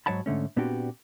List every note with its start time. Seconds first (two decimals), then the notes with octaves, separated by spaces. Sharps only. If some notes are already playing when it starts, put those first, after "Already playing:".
0.06 G#2 F#3 C#5 F#5 A5 B5
0.26 G#2 D3 A3 C#4
0.56 A#2 B3 C4 D4 F#4 G4